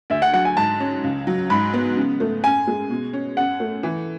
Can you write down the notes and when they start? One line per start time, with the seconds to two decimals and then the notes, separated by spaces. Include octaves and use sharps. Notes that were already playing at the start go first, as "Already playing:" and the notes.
0.10 D2 E5
0.22 F#5
0.33 F#3 F#5
0.45 G#5
0.57 G#2 A5
0.80 C#4
1.04 C#2
1.27 F#3
1.50 G#2 B5
1.74 B3
1.97 C#3
2.20 A3
2.44 F#2 G#5
2.67 G#3
2.90 B2
3.13 C#4
3.37 F#2 F#5
3.60 A3
3.83 E3